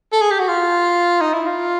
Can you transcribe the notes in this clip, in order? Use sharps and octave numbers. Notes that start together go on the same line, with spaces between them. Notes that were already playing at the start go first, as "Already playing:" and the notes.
A4
G#4
G4
F#4
F4
D#4
E4
F4